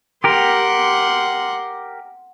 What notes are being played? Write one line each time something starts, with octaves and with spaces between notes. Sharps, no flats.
G4 A#4 F#5 C6